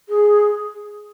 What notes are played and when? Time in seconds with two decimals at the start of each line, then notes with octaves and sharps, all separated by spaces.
0.09 G#4